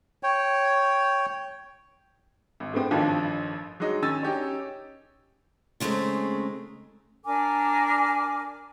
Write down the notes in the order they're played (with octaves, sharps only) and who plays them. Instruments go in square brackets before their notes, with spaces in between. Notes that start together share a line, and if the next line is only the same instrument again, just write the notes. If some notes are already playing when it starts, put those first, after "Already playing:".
[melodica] C#5 G5
[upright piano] G#1
A2 B3 C4
A1 G2 D#3 F3
F#3 G#3 D#4
D#3 C#4 G#5 E6 A6
C#4 D#4 G4 C#5
[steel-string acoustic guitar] C#3 G#3 A3 C4 D#4
[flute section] D4 A#4 G#5 D6